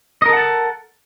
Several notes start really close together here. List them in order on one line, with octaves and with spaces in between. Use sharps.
D#5 A#4 A4 F#5 A5